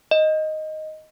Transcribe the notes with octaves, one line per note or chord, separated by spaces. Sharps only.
D#5